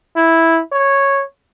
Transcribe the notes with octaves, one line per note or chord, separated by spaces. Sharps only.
E4
C#5